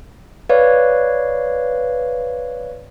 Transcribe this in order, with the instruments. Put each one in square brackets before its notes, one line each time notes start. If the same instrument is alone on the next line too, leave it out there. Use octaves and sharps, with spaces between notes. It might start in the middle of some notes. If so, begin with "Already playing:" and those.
[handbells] B4 C#5 D5 F5